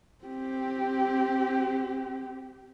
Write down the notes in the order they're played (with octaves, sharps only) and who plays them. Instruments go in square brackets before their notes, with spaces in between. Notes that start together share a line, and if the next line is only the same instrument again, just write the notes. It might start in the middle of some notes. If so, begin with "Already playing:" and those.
[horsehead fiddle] C4 G4